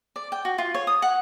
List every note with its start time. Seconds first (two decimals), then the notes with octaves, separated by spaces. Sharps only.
0.16 D5
0.32 G5
0.45 F#4
0.58 F4
0.74 C#5
0.87 D#6
1.02 F#5